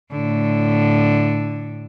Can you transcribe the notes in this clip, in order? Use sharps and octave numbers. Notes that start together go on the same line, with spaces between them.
A2 D3